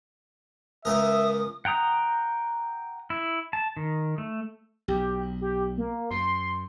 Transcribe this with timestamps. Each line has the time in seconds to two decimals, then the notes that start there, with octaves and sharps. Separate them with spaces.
0.85 C#2 A#4 E5 D#6
1.65 F#5 G5 A#5 D#6
3.10 E4
3.53 A5
3.77 D#3
4.18 A3
4.88 B1 G4
5.41 G4
5.78 A#3
6.11 F#2 C6